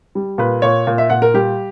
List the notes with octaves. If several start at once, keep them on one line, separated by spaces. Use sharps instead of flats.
G3
A#2 B4
A#2 C#5
A#2
E5
A#2 F#5
A#4
G3 G4